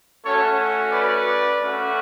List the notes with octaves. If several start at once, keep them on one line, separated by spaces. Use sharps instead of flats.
A3 C#4 F#4 A4 C#5
B4 D5
A3 C#4 F#4